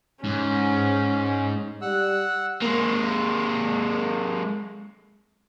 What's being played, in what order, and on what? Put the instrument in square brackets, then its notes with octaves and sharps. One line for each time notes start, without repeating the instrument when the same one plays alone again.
[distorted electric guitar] G#2 [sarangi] C#4
[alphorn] G3 [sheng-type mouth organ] F#5 E6 F#6
[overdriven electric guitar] G#3 A#3